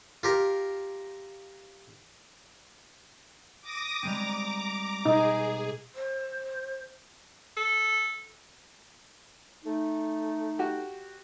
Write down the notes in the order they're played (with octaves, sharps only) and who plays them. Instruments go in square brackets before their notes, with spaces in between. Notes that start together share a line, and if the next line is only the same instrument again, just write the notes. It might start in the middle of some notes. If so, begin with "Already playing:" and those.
[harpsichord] F4 G4 A#4
[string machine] D6 D#6 A#6
[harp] G3 G#3 C4 [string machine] A#5 D6
[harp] B2 [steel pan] D#4 [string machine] G#4
[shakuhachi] C5
[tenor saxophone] A4
[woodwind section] A3 D#4
[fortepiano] F#4 G4